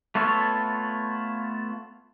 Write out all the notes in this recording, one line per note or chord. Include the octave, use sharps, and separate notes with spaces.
A3 B3 F4 A4 C#5